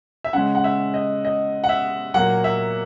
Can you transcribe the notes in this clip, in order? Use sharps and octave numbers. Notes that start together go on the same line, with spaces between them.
E5
C#3 G#3 F#5
F#5
E5
D#5
D#5
F#5
E5
A#2 F#3 A#3 F#5
E5